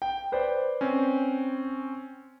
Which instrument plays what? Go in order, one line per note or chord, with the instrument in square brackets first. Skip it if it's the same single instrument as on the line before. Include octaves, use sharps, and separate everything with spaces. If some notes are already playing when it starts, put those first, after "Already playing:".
[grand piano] G5
B4 C5 D5
[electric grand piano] C4 C#4